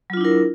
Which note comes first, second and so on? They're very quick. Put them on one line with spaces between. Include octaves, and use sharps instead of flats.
F#3 F4 D4 E4 A#4